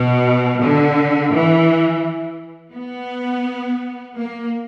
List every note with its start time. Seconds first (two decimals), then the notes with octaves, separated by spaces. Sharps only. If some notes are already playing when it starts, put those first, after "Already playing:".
Already playing: B2
0.60 D3
1.32 E3
2.74 B3
4.17 A#3